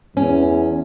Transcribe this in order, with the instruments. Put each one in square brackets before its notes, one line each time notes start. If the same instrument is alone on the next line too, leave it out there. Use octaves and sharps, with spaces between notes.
[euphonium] E2 [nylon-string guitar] C#4